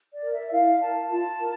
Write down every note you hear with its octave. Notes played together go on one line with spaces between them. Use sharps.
D5
A#4
E5
E4 F5
A#4 A5
F4 A5
A#4